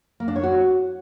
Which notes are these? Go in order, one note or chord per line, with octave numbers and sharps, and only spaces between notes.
A#3
D4
C#5
F#4